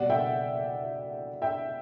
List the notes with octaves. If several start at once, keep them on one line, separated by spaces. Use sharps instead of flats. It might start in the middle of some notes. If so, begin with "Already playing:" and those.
Already playing: B2 G3 D5 F#5
E5 G5
E5 G5